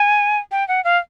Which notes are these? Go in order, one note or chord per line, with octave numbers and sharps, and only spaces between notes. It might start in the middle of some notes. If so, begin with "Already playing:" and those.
Already playing: G#5
G5
F#5
F5